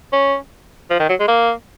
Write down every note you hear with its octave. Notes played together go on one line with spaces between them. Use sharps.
C#4
F3
D#3
F#3
G#3
A#3